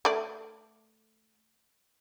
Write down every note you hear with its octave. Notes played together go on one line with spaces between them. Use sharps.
A3 D5